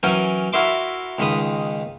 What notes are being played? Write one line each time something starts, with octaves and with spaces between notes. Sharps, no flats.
E3 F#3 C#4 A#4 G5 G#5
E4 F#4 A#4 E5 C6 D6
C#2 D#3 G#3 B5 D#6